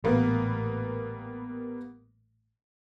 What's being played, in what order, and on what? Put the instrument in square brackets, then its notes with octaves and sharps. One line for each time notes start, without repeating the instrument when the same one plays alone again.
[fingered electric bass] A1 A#2 [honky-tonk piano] G3 A#3 B3